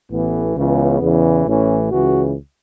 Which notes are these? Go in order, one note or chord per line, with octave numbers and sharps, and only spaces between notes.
A1 A2 E3 B3
C#2 C#3 E3 B3
E2 C#3 E3
A1 A2 E3 C#4
C#2 C#3 E3 F#4